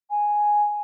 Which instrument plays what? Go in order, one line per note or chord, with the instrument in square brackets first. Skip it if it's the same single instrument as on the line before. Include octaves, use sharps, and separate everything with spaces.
[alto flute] G#5